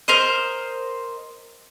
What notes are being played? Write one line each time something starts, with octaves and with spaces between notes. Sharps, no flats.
A#4 C5 D#5